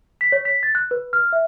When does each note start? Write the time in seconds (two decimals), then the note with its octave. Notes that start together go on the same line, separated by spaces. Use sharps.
0.21 B6
0.32 C#5
0.45 B6
0.63 A6
0.75 F#6
0.91 B4
1.13 F6
1.33 E5